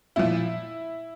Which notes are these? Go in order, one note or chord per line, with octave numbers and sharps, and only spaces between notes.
A#2 F3 E4